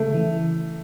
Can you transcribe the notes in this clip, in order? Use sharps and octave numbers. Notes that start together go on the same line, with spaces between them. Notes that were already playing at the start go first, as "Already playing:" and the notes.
Already playing: C#3 A3
E3